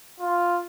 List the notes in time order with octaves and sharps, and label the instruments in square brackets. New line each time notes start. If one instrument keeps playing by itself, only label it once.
[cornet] F4